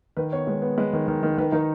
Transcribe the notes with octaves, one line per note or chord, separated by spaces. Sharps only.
D#3 B4
B3 C#5
G#3 B4
B3
G#3 B4
D#3
D#3
D#3
D#3 B4
D#3 D#4